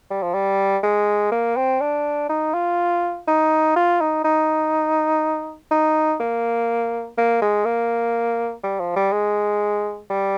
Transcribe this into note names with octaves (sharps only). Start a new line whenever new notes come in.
G3
F3
G3
G#3
A#3
C4
D4
D#4
F4
D#4
F4
D#4
D#4
D#4
A#3
A#3
G#3
A#3
G3
F3
G3
G#3
G3